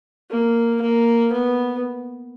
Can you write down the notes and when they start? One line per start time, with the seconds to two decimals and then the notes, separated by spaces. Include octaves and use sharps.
0.30 A#3
0.81 A#3
1.32 B3